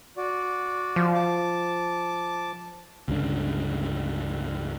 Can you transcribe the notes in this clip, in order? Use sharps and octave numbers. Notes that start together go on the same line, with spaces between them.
F#4 D5
F3
A5 D6
C#2 G2 D3